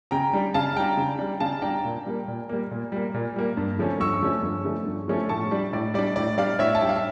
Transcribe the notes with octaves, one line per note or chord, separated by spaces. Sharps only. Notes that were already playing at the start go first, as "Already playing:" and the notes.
C#3 G5 A#5
G3 D4
C#3 F5 A5
G3 D4 G5 A#5
C#3
G3 D4
C#3 F5 A5
G3 D4 G5 A#5
A#2
G3 A#3
A#2
G3 A#3
A#2
G3 A#3
A#2
G3 A#3
G2
D3 F3 A3 C#4
G2 C#6 E6
D3 F3 A3 C#4
G2
D3 F3 A3 C#4
G2
D3 F3 A3 C#4
A2 A5 C#6
G3 D4
A2 D5
G3 D4 D5
A2 D5
G3 D4 D5 F5
A2 C#5 E5
A5
G3 D4 G5
F5
E5